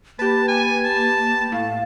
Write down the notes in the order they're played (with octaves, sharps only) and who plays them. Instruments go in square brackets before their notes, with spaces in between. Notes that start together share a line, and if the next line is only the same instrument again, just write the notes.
[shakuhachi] A#3 [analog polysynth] G4 B4 [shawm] A5
[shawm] G#5
A5
[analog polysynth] A2 [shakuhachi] F5